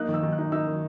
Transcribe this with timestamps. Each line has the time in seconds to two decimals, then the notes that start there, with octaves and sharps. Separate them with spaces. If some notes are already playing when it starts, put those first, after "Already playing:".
Already playing: A#3 D#4 F#6
0.09 D#3
0.14 E6
0.23 D#3
0.32 F#6
0.39 D#4
0.52 D#4 E6
0.67 D#3